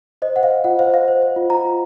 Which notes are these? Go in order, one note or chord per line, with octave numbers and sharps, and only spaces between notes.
C5 D#5
C5 F#5
F5
C5
F4 F#5
C5 F5
C5 F5
C5
C5
F4
F4 A#5
F4